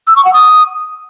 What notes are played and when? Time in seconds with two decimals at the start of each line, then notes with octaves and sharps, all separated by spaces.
0.07 E6
0.16 C#6
0.25 F#5
0.34 D#6